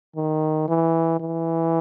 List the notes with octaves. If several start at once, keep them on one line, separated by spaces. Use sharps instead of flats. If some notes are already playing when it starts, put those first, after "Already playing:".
D#3
E3
E3